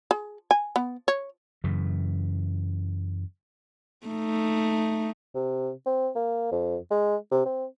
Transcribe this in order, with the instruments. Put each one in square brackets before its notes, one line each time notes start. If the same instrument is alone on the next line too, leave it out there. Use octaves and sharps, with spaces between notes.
[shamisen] G#4
G#5
B3
C#5
[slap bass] F#2 C#3 E3
[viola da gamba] A3 D#4
[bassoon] C3
C4
A#3
F2
G#3
C3
C4